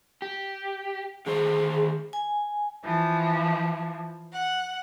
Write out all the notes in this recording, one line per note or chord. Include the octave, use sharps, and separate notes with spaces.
G4
D3 D#3 G#4 C5
G#5
E3 F3
F#5